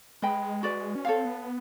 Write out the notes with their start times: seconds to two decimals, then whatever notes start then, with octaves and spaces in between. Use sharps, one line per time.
0.22 G#3 B4 D#5 G5 B5
0.63 F#4 B4 D5
0.95 C#4
1.05 C4 A4 C#5 F5
1.25 B3